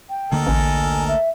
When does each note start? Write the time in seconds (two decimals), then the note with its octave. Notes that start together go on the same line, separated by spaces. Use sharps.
0.10 G5
0.32 D2 D3 A#3 A4 A#4 D#5
0.46 A1 G#5
1.08 E5